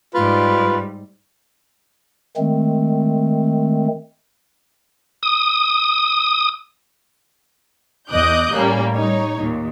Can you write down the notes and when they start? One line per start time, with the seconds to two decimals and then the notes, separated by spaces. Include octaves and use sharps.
0.15 G#2 G3 F4 B4
2.36 D#3 G#3 A3 C4
5.23 D#6
8.10 E2 D#5 D6 D#6 F#6 G6
8.53 A2 G3 A#3 C#4
8.93 G3 D#4 C#5
9.39 D#2 A#2